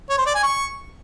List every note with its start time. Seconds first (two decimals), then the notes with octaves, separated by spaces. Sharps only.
0.10 C#5
0.18 C5
0.27 D5
0.35 G#5
0.43 C#6